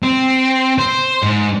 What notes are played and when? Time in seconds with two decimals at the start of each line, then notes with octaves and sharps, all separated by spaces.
0.03 C4
0.78 C5
1.23 G#2